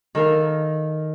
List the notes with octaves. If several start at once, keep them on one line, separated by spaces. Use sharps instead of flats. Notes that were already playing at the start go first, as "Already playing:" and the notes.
D#3 A4 A#4 F5